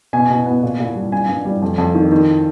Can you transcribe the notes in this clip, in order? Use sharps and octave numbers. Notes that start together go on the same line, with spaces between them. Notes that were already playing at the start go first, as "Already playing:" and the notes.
B2 G#5
B2
B3
A#2
A#2
G3
G2 G#5
G2
G3
F2
F2
D#3
D#3